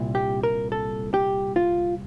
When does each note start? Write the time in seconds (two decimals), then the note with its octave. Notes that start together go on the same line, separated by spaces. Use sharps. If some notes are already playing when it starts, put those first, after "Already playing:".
Already playing: C2 A#2
0.15 G4
0.43 A#4
0.72 A4
1.14 G4
1.56 F4